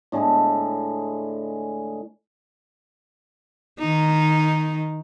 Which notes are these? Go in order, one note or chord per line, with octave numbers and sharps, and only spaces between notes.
A2 D3 G#3 G#4
D#3 D#4